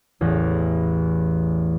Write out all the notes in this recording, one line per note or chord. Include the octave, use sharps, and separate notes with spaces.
A1 E2